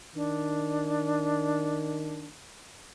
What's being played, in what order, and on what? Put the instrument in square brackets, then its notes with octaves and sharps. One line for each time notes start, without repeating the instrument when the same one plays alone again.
[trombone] D#3 [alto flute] D4